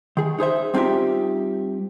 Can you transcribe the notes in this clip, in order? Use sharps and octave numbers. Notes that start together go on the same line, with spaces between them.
D#3 G#4
D#4 G#4 C5 E5
G3 C4 D#4 F4 G4 E5